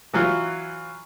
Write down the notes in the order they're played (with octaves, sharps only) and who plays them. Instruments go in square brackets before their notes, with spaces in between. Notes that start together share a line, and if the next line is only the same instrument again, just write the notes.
[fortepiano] E3 F#3 F4